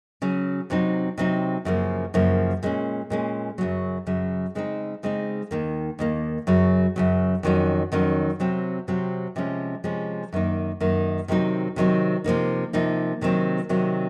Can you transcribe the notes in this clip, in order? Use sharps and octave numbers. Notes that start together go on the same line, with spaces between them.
C#3 F#3 C#4
C3 F#3 C4 D#4
C3 F#3 C4 D#4
F#2 C#3 F3 A#3
F#2 C#3 F3 A#3
A#2 G#3 C#4
A#2 G#3 C#4
F#2 C#3 F#3
F#2 C#3 F#3
C#3 G#3 C4 D#4
C#3 G#3 C4 D#4
D#2 D#3 A#3
D#2 D#3 A#3
F#2 C#3 F#3
F#2 C#3 F#3
F2 D#3 F#3 C#4
F2 D#3 F#3 C#4
C3 F#3 C4
C3 F#3 C4
C3 F3 G#3 C#4
C3 F3 G#3 C#4
F#2 D#3 A#3 D#4
F#2 D#3 A#3 D#4
C3 D#3 F#3 C4 D#4
C3 D#3 F#3 C4 D#4
C3 F3 A#3 D#4
C3 F3 A#3 D#4
C3 D#3 F#3 C4
C3 D#3 F#3 C4